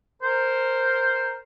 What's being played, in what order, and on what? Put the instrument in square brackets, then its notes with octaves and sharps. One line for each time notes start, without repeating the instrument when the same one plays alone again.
[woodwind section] A#4 C5